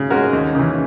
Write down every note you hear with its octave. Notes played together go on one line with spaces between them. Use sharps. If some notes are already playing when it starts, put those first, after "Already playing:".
Already playing: C#3 C#4
G#3 C#4 F#4 A#4
D#2
C#3 E3